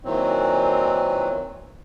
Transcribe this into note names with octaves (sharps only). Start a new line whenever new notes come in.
A#2 D#3 E3 F#3 C4